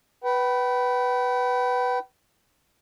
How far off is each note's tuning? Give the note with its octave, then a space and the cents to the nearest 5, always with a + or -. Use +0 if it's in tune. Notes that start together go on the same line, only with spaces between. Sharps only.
B4 +0 G5 -40